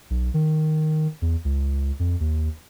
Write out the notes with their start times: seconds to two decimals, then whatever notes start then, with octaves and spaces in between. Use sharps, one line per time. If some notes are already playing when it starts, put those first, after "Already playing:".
0.10 B1
0.34 D#3
1.22 E2
1.45 C#2
1.99 F2
2.20 D#2